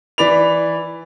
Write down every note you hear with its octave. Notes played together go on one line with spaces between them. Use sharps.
E3 D5 B5 F7